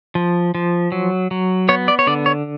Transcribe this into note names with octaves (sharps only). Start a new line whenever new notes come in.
F3
F3
F#3
F#3
B3 C#5
D5
C#5
D3 D5
C#5